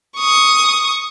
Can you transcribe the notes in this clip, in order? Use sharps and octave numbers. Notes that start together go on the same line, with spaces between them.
C#6 D#6